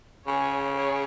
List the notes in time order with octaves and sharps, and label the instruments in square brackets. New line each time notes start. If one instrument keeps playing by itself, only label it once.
[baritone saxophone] C#3 [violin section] G#4 C#5
[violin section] G#4 C#5